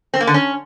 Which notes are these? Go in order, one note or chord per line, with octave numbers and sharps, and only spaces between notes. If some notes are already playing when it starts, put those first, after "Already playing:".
C4
A#3
D3
C#4